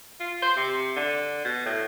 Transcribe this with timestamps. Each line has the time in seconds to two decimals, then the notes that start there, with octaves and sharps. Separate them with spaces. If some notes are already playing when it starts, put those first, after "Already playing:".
0.20 F4
0.42 C5
0.57 C3
0.96 D3
1.45 B2
1.66 A2